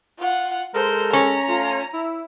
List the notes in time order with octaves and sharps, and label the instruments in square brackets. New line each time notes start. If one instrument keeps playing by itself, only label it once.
[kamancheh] F4 F#5
[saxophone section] G#3 A4 A#4 [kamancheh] C5
[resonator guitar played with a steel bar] C#4 [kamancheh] A#5
[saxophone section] A3 F4
E4